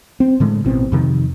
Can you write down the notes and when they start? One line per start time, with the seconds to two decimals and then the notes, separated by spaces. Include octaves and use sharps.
0.20 C4
0.40 A2 D3 G#3
0.65 A1 B2 C4
0.92 F2 C3 D#3